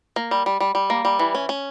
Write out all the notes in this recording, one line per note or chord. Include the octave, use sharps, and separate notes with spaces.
A#3
G3
G3
G3
G3
A#3
G3
E3
C#4
C#4